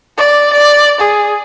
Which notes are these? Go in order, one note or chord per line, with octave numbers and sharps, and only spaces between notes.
D5
D5
G#4